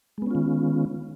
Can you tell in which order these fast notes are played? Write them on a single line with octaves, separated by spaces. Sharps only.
G#3 B3 C#4 F4 D#3